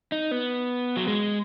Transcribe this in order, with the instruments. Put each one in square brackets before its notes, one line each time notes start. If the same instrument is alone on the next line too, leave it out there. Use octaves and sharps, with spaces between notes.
[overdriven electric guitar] D#4
B3
F#3
G#3